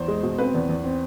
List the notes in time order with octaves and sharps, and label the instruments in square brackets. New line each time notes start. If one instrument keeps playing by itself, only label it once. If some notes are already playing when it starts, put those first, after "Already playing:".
Already playing: [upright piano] E2 C5
G#3
B2
C4 B4
E2
E2
C4